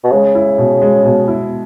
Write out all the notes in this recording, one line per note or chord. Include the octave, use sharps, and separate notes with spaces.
B2
C#3 G#3
E4
B2
G#3
B2
E4